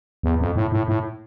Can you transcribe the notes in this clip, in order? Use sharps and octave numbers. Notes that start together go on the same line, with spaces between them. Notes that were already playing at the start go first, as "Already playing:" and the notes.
E2
F2
A2
A2
A2